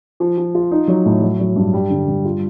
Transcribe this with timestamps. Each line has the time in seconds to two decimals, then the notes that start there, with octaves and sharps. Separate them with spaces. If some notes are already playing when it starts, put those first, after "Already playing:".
0.20 F3
0.38 F3
0.55 F4
0.71 D#4
0.88 F#3
1.06 A2
1.22 F#3
1.40 F#3
1.56 G2
1.74 G3
1.90 D3
2.08 G2
2.25 F4